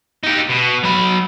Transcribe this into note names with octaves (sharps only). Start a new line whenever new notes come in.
D#4 G4
B2
F#3 B5